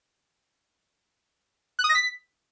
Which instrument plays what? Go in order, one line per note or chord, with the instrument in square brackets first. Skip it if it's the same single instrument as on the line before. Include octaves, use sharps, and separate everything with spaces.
[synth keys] F#6
D#6
A#6
B6